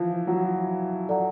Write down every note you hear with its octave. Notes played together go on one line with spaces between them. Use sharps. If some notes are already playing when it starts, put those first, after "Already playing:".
Already playing: E3 F3
F#3
F#4 A4 D5 F#5 A#5